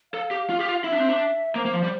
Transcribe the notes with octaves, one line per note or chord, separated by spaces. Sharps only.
A4 F5
G4
F4
G4
F4
E4 E5
D4
C4
D4
A#3 C5
A#3
F3
G3